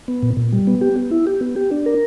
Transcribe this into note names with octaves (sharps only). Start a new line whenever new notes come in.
B3
A#2
A#2
G3
B3
G4
B3
E4
G4
B3
G4
D4
A#4